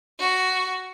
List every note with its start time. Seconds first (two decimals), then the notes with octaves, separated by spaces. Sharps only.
0.19 F#4